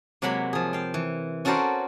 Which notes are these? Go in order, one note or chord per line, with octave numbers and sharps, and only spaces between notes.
C3 F#3 G#3 A#3 F#5 B5
F3 G#4
F5 G5
E3
C#4 F#4 A4 A#4 C5 D5